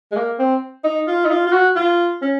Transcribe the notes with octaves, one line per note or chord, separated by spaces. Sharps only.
G#3
A#3
C4
D#4
F4
D#4
F4
F4
F#4
F4
C#4